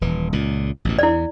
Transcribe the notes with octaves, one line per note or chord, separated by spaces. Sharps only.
D#1 E3
C#2 A#2
A1 D#2 B2
E2 E4 D5